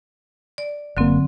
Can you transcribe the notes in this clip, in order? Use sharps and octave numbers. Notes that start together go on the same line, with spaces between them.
D5
F#1 D3 F#3 A#3 C4